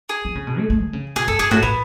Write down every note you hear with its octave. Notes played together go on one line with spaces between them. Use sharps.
G#4
F3
C#3
B2
A3
A3
D3
C#3
B2 G#4
F#2 A4
F#2 G#4
A2 F#4
A2 B3